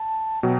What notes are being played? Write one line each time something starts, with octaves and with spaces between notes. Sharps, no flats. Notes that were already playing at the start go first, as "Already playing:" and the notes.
Already playing: A5
B2 F#3 G5